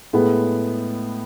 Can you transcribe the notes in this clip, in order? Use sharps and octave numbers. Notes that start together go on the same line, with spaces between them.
A2 G#3 B3